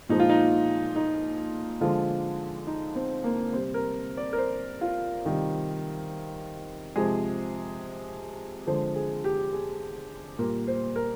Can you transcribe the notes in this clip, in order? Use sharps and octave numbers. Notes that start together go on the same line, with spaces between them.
A#2 F3 G#3 D#4
F4
D#4
D#4
D3 F3 G#3 F4
D#4
C4
A#3
C3 G3 C4
A#4
D5
A#4
C5
F4
C3 D#3 G3
C3 F3 G#3 G#4
D3 F3 G#3 C5
G#4
G4
G#4
A#2 G3 A#4
C5
A#4